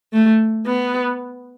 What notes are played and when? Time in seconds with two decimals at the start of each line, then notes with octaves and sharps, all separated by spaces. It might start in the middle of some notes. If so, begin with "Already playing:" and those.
0.13 A3
0.67 B3